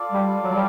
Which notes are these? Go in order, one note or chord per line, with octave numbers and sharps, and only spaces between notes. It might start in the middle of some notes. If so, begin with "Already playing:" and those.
Already playing: F4 A4 D5
G3
F#3
G3